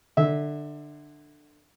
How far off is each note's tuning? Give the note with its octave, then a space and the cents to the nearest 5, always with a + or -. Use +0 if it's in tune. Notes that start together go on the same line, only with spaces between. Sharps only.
D3 +15 E5 -15